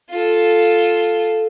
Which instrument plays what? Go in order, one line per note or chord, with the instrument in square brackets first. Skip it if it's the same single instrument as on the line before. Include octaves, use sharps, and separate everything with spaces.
[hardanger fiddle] F4 A4